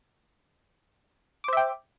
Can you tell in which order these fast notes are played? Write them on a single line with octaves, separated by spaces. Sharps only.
D6 C5 E5 G5